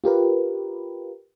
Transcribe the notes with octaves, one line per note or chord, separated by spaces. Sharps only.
F4 G4 A#4 B4